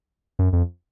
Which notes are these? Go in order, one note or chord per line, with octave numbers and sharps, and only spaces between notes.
F#2
F2